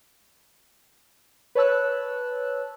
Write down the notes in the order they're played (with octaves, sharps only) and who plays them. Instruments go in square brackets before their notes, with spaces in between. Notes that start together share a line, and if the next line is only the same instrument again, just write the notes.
[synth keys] B4 C#5 A5 E6 F#6